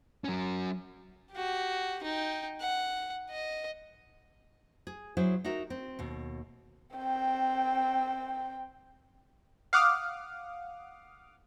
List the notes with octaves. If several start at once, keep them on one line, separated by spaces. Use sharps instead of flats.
F#3 C#4
F#4 G4
D#4 G5
F#5
D#5
G#4
F#3 E4 G#4 C5
D#4 F#4 A#4 E5
C4
D#2 B2
C4 G5
F5 F#5 D6 D#6 F6